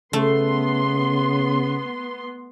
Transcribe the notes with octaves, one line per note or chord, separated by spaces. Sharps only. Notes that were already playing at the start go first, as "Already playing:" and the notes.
C#3 A3 B3 C6